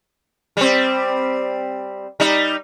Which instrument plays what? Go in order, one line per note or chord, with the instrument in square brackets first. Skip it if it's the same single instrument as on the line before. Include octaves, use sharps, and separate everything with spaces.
[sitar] G3 C4
G3 D#4